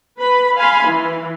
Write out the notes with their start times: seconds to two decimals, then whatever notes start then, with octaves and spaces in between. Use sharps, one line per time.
0.20 B4 B5
0.56 F5 G#5 B5 C6
0.86 E3